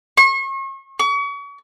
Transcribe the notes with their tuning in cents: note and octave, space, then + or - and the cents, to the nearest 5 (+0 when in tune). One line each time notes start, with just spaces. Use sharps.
C#6 -40
C#6 +40